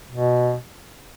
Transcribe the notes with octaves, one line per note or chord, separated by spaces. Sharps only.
B2